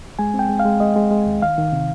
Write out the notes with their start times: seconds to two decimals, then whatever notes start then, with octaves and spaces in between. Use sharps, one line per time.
0.19 G#3 G#5
0.34 C4
0.39 G5
0.49 G#3
0.59 F5
0.65 G#3
0.80 G#3 D#5
0.96 G#3
1.11 G#3
1.27 D#2
1.42 D#3 F5
1.58 D#3
1.73 C3